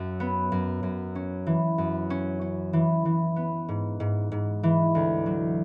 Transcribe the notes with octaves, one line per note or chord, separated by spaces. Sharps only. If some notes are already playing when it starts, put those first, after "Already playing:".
Already playing: F#2
B3
F#2
F#2
C#4
E3
F#2
C#4
C#4
E3
E3
B3
G#2
G#2
G#2
E3
D2
F#3